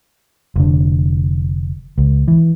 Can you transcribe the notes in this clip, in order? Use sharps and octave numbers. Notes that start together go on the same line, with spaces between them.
F1 D3
C#2
E3